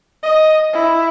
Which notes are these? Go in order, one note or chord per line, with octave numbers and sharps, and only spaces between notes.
D#5
E4